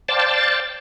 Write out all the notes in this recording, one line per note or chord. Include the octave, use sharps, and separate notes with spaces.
C5 D5 F5 G5 A5 A6